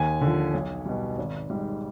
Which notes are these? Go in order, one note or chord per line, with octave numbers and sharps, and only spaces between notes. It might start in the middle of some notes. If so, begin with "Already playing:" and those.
Already playing: D#2 G#5
D3 F3
B1
B2 G3
G#1
G#2 G3